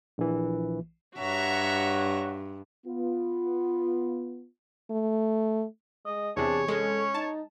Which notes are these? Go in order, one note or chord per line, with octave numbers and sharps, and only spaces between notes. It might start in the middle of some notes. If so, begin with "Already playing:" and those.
A#1 E3
G2 F#4 C#5 E5 F#5 A#5
B3 F4
A3
G#3 D#5
E2 C3 D4 G#4 C#5
G#3 C#4 A4
D#4 A5